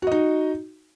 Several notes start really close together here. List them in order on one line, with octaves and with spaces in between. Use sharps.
F#4 D#5 D#4